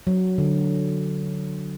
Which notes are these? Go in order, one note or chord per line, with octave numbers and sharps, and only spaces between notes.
F#3
D3